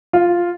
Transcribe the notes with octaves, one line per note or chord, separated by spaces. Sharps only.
F4